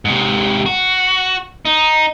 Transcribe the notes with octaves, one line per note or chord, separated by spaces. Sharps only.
G#2 C3
F#4
D#4